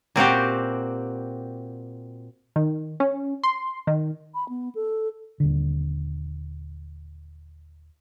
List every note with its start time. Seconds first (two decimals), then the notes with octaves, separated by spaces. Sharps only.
0.16 A#2 C4 F#4 G4
2.56 D#3
3.00 C#4
3.43 C6
3.87 D#3
4.34 B5
4.49 B3
4.75 A4
5.40 D#1 D3